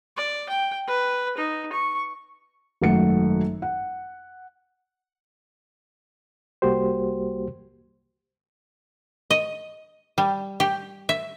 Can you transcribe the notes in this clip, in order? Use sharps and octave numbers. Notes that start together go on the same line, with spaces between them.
D5
G5
B4
D#4
C#6
G#1 F#2 A3 F#5 C#7
F#5
C2 G3 A#3 F#4 G4 C5
D#5
G3
G4
E5